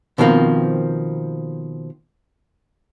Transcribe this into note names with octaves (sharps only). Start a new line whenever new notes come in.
B2 D#3 F3 G3 A#3 C4